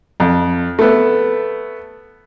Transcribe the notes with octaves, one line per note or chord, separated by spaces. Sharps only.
F2
A3 B3